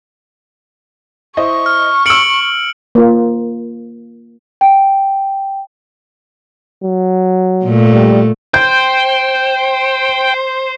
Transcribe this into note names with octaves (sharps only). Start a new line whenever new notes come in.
E4 C5 D#5 C#6
F6
E6 F6 C#7 D7 F#7
A#3 F4
G5
F#3
A#2 A3
G3
C5 G5 G6